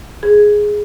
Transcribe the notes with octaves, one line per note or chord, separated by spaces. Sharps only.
G#4